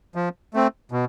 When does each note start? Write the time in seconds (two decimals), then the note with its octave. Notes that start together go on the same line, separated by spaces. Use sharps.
0.15 F3
0.54 A3 C4
0.92 B2